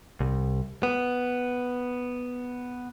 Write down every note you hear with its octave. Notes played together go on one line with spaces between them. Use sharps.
C2
B3